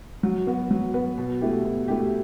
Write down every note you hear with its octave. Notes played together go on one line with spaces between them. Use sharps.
F#3
B3 F#4 B4
F#3
B3 F#4 B4
B2
A3 E4 G4
B2
A3 E4 G4